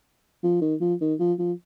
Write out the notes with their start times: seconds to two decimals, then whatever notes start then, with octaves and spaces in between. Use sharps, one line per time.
0.43 F3
0.62 D#3
0.81 F3
1.01 D#3
1.19 F3
1.39 F3